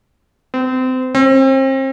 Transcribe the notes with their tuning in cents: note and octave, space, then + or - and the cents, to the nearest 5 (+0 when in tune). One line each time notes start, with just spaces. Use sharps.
C4 -30
C4 +35